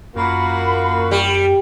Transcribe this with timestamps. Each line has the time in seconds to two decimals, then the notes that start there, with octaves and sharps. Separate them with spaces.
0.16 F#2 A#3 F4 F#4 B5
1.11 G3